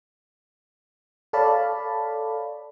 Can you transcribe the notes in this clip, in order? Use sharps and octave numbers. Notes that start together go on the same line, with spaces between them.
A4 C#5 D5 F5 A5 B5